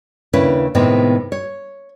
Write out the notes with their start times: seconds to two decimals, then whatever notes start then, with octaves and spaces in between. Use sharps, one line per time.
0.33 D#2 C#3 C#4 D4 E4 B4
0.75 A2 C3 D#3 G#3 B3 C4
1.32 C#5